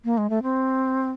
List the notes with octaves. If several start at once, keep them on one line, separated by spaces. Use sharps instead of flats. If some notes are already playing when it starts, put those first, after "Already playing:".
A#3
G#3
A3
C4